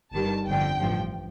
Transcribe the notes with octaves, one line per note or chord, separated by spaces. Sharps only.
G1 G2 D#3 G3 A5
G1 F2 D3 G5
A1 G2 F3